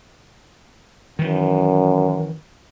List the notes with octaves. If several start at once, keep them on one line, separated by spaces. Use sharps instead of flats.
F#2 D#3 E3